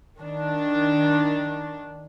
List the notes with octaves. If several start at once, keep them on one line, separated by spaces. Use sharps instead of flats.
D#3 D4